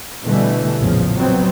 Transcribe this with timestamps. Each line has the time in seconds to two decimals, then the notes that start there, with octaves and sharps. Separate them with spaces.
0.25 B2 D3 E3 G3 A3
0.79 A#1 E2 A2 C#3 F3
1.17 B2 F#3 B3 C4